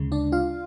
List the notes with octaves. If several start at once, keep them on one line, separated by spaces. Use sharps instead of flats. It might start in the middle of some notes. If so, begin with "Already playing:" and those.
Already playing: D2 C#3 G#3
D4 D5
F4 F5